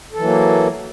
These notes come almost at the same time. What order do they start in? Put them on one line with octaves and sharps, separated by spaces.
A4 E3 F#3 A#3